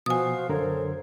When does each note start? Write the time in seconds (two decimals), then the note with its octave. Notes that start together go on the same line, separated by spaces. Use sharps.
0.06 B2 F3 F#4 C5 F5 G#5 D#6
0.49 F#2 D3 A4 A#4 C5 C#5